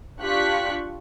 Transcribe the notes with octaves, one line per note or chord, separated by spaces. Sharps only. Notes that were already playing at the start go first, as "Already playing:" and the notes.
D4 F4 G4 C#6 F#6 B6